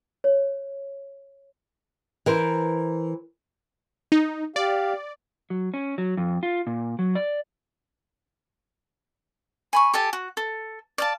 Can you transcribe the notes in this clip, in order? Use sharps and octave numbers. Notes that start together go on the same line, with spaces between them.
C#5
E3 A#4 C5
D#4
G4 D5 F5
F#3
C#4
F#3
F2
F4
A#2
F#3
D5
G#5 B5 C#6
G4 A4 G#5 A5
F#4
A4
D5 F5 A5